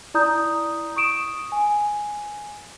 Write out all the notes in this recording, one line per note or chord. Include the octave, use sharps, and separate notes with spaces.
E4 D5 A#5 D#6 G6
C#6 D#6 D7 E7
G#5